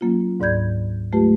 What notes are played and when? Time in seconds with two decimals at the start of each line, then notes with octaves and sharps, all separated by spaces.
0.01 F#3 A#3 C#4 F4
0.40 D2 G#2 D5 B5 G6 G#6
1.12 F#3 G#3 A3 F4 G4 B4